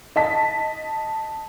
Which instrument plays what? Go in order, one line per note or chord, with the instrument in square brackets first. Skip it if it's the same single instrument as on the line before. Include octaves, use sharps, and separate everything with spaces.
[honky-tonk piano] D#5 A5 B6